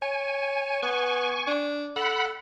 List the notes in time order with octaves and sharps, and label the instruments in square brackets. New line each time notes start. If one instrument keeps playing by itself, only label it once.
[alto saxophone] C#5 [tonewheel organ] G#5
[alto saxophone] B3 [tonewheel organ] G#5 C#6
[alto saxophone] D4
[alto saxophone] A4 [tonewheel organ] F#5 B5